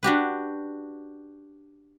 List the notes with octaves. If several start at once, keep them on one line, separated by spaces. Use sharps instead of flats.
D4 F#4 G4 B4